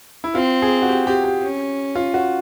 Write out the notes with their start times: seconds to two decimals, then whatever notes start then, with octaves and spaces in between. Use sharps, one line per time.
0.24 E4
0.35 C4 F4
0.62 G#4
0.82 F#4
0.88 G4
1.07 G4
1.24 G4
1.42 C#4
1.95 F4
2.14 F#4